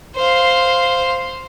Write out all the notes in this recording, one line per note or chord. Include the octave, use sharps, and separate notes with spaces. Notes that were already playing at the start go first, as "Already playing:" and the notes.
C5 F5